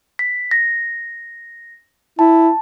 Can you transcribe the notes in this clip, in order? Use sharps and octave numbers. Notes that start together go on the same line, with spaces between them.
B6
A#6
E4 A5